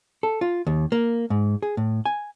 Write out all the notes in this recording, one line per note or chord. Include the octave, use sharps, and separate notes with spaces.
A4
F4
D#2
A#3
G#2
G#4
A2
G#5